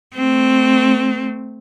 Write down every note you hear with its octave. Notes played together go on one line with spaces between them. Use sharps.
A3 C4